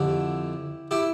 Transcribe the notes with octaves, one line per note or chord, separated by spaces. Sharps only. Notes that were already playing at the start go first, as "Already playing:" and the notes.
Already playing: F2 D3 E4 G4
E4 G4